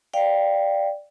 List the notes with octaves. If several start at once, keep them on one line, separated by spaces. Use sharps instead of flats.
D5 F5 G5